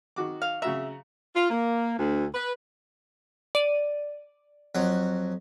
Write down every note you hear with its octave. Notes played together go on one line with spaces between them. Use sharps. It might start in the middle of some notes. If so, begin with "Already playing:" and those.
D#3 F#4 D6
F5
C#3 F#4 E5 A#5
F4
A#3
D2
B4
D5 D#7
F2 F#3